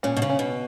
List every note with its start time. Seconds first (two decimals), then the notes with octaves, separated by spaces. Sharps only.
0.03 A#2 C#4
0.16 B2
0.22 C#3
0.30 C#4
0.39 B2